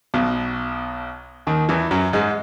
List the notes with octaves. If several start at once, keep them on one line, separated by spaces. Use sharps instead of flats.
B1 B2
D#2 D#3
E2 E3
F#2 F#3
G#2 G#3